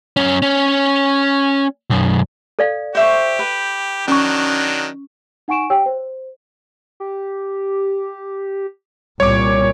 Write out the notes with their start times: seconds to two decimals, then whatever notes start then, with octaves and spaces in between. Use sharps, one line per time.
0.17 F#2 C#4
0.42 C#4
1.90 B1 F#2
2.59 A4 D5 F5
2.95 G4 C5 E5 C#6
3.39 B4
4.08 D#3 F#3 C#4 D4 C#6
5.48 D#4 F#5 G#5 C#6 D7 E7
5.70 G4 C#5 G5 E6
5.86 C5
7.00 G4
9.20 C2 A#2 G3 C#5 D6